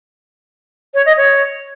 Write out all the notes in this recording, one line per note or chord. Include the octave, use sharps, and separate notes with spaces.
C#5
D#5
C#5